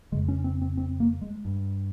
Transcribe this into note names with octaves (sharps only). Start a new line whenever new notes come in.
F2 C#3 G#3
C#4
C4
C4
C4
A#3
G#3
G2